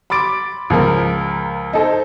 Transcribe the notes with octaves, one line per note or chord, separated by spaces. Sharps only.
B5 C6 D6 A6 D7
C#2 F3 A#4
D#4 A4 C5